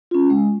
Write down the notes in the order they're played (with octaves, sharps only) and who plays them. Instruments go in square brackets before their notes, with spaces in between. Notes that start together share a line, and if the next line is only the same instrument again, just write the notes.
[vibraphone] C#4 F4
G#3